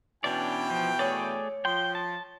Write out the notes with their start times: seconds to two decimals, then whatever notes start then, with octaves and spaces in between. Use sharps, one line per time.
0.24 B2 E3 C#4 D4 D5 G5
0.70 F3
0.99 A3 G#4 C#5 D5
1.65 F3 G5 C6
1.95 A5